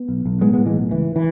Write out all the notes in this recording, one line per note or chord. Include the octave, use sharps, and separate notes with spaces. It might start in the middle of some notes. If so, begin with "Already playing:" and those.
Already playing: B3
B1
B1
A2 G#3 B3
A2 G#3 B3
E3 G#3
B1
C#2 E3
E3